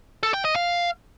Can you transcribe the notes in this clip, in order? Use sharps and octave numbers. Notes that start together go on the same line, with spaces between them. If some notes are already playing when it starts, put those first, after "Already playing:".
A4
G5
D#5
F5